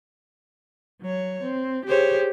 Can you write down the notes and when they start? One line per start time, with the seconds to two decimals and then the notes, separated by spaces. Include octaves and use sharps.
1.02 F#3 C#5
1.43 C4
1.86 G4 G#4 C5 C#5